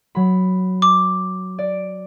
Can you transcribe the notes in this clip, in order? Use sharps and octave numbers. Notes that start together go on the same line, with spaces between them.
F#3 B5
D6
D5